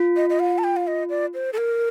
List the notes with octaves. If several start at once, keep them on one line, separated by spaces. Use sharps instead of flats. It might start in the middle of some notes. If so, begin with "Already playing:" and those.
Already playing: F4
D#5
D#5
F5
A5
G5
F5
D#5
D5
C5
A4
A#4